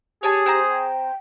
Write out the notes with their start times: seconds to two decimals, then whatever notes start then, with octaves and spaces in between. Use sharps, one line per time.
0.23 G4 G#4 C#5 G#5 A5
0.46 C4 C5 A#5
0.71 G5